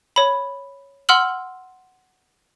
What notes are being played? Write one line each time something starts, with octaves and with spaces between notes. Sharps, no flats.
C#5 B5
F#5 C6 E6 F6 F#7